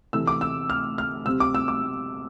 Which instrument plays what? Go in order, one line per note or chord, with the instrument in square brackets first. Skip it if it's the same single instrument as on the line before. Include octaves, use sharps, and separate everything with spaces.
[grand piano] C3 E3 A3 E6
D6
E6
F6
F6
C3 G3 C4 E6
D6
E6
D6